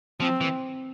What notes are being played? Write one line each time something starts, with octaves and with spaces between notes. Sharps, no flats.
F3 C4
E3